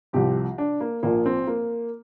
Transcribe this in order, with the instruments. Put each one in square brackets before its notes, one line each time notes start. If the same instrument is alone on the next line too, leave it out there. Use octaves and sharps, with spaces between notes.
[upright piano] C2 C3 F3 G4
D4
A#3
A#1 A#2 F3 A#3
C4
A#3